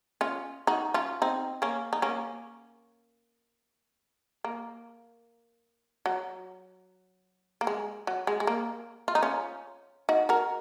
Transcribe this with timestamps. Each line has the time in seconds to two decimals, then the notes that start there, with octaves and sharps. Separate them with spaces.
0.21 C#4 F4
0.67 D#4 F#4
0.94 C#4 F4
1.22 C4 D#4
1.62 A#3 C#4
1.93 D#4
2.02 A#3 C#4
4.44 A#3
6.06 F#3
7.61 A#3
7.67 G#3
8.07 F#3
8.27 G#3
8.40 G#3
8.47 A#3
9.08 F4
9.15 D#4
9.22 C#4 F4
10.09 D#4 F#4
10.29 F#4 A#4